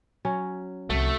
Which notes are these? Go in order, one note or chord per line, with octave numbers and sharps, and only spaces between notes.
F#3 C#4
C2 F3 A3 F#4